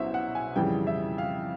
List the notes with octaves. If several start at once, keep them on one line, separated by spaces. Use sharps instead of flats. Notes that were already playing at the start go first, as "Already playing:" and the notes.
Already playing: C2 B2 F#3 C#4 C5 E5
F#5
G#5
F2 C#3 E3 G3 G5
E5
F5